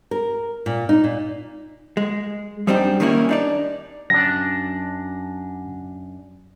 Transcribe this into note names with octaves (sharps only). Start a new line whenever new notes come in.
A#4
A#2
D#4
A#2
G#3
F#2 G3 C4 D4 D#4 G4
D#3 G3 A#3 C#4 E4
D4 D#4 D5
F#2 D4 A#6